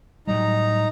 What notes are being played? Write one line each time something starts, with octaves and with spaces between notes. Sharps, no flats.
A2 F#3 G3 D#4 A#5